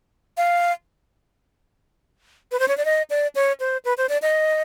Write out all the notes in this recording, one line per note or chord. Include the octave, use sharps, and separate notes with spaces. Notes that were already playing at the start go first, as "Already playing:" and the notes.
F5
B4
C5
C#5
D5
D#5
D5
C#5
C5
B4
C5
D5
D#5